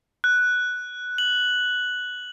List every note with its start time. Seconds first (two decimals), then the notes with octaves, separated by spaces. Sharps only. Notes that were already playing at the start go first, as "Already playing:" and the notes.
0.24 F#6
1.18 F#7